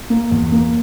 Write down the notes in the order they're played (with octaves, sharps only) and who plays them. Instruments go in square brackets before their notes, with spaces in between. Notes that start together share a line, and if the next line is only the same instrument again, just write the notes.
[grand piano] A#3
E2
A#3